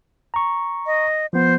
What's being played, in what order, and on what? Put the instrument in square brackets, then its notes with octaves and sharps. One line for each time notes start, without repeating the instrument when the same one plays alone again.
[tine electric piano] A#5 C#6
[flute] D#5
[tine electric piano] F3 B3 [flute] C5